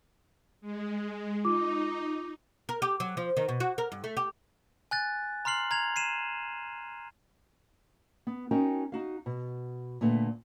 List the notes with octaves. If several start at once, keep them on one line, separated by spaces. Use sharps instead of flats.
G#3
D#4 F4 D6
A#4
G4
F#3
F3
D#3
B2
F#4
A#4
G2
A3
G4
G#5 F#6 A6
A#5 C6 F6 C7 F#7
A#5 G#6 F7
C7 D#7 E7
B3
C#4 D#4 F#4 A#4 G5
D#4 F#4 F5
B2
A#2 D3 A3 B3